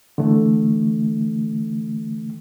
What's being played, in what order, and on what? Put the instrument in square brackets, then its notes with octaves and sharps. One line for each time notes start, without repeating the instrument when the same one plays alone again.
[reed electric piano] D3 E3 A3